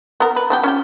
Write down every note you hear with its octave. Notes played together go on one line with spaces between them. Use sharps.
B3 A#4
B4
F3 B3 G4
C#4 F4 G4